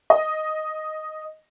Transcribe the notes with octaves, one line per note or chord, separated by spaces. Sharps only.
D#5